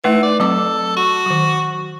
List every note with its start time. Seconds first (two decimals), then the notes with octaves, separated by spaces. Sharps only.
0.04 E3 A3 D#4 B4
0.23 D5
0.40 F#3 C4 A4 D6
0.97 F#4
1.26 D#3 F#3